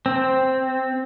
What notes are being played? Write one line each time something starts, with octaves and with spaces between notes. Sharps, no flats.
C4